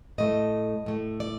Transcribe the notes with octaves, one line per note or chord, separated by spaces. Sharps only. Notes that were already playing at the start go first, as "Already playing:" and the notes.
A2 A3 D#5
A2 A3
D5